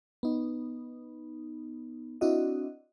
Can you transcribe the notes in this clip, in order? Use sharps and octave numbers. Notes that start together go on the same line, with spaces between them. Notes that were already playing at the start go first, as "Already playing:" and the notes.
B3 D#4
C4 D4 E4 F#4 D#5